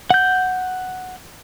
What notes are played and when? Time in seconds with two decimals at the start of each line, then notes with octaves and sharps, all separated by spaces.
0.10 F#5 G6